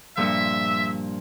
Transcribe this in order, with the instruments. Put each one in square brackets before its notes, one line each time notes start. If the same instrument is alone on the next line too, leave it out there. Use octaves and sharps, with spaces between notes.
[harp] G2 A#2 F3 [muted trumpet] E5